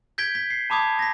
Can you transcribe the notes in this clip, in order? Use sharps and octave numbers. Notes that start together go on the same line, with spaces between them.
G6 G#6 B6 D7 G7
B6
C7
A5 B5 D6 D#6 G#6
A#6 B6